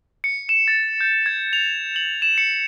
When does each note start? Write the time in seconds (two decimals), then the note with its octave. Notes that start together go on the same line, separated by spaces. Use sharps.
0.24 C#7
0.49 E7
0.68 A6
1.01 G6
1.26 G#6
1.53 F7
1.96 F#7
2.22 E7
2.38 C#7